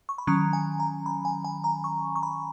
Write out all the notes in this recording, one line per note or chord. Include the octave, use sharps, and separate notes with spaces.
C#6
B5
D#3 F#3 C#4 A#5
G#5
A#5
B5
G#5
G#5
A#5
C#6
C#6
B5